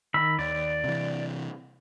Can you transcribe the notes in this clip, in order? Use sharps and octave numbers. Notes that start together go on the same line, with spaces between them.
D#3 B5 E6
D#2 D5
C3 E3